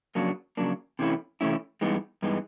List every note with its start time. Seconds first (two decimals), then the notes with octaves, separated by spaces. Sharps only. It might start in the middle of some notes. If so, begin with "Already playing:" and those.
0.15 F2 C#3 F#3 A#3 D4
0.57 F2 C#3 F#3 A#3 D4
0.99 C3 E3 A3 C#4 E4
1.41 C3 E3 A3 C#4 E4
1.81 G2 E3 G#3 B3 D#4
2.22 G2 E3 G#3 B3 D#4